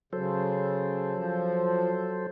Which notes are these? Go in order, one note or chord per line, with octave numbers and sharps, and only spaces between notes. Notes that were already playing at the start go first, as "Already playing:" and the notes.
C#3 F#3 A4 C5
F3